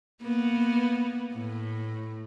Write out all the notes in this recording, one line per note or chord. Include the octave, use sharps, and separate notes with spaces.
A#3 B3
A2